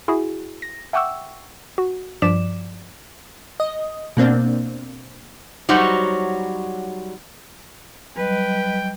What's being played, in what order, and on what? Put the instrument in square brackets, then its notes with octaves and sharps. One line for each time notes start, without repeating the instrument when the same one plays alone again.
[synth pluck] E4 F#4 G#4
A#6
E5 F#5 G5 C#6 D6 E6
F#4
G2 F3 D5 D6 B6 E7
[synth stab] D#5
B2 A#3 C4 D4
[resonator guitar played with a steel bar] F#3 G3 D#4 F#4 C5 C#5
[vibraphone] F#3 G3 D#5 [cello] B4 [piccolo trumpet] G5